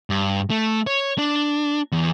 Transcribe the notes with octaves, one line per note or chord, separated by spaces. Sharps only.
G2
A3
C#5
D4
E2